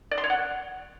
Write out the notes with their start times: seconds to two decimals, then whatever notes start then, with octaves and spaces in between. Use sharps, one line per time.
0.11 D5
0.18 C6
0.24 C#5
0.30 F#5